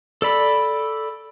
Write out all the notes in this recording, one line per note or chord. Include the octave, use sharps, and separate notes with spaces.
A4 D5 B5